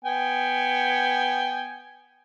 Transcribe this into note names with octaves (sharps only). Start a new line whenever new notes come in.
B3 G5 G#5